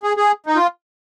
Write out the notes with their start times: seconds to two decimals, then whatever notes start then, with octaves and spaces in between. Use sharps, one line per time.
0.03 G#4
0.17 G#4
0.46 D#4
0.56 F4